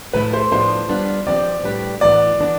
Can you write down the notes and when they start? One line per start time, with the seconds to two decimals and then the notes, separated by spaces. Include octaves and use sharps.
0.13 A2 F3 A3 E4 B4
0.33 C5
0.52 A2 F3 B3 D4 F4 C5
0.89 G3 B3 D4 F4 B4
1.27 F3 C4 G4 D5
1.64 A2 G3 D4 G4 B4
2.01 A2 E3 B3 D5
2.39 E3 B3 D4